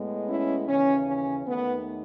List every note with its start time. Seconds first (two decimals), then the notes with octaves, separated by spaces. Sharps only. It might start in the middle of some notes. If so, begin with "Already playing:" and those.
Already playing: A2 G#3 B3
0.27 C#4 E4
0.67 D#2 C#3 E3 C#4
1.07 C#4
1.46 D#2 D#3 A3 B3